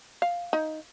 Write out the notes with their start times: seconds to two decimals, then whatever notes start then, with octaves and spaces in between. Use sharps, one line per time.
0.22 F5
0.53 D#4